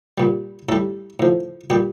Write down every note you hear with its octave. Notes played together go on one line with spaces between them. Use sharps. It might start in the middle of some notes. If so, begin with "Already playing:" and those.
A#2 G3
A2 G3 A4
A2 F3
A#2 G3 G4